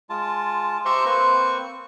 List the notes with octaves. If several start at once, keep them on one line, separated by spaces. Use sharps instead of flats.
G#3 F4 A5
G4 C5 E5 A#5 C6 C#6
A#3 C4 B4 C5 C#6